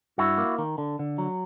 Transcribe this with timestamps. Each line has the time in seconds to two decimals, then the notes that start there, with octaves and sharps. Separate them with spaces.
0.18 G2 E4 F#4
0.38 A#3
0.58 D#3
0.78 D3
0.99 D3
1.18 F#3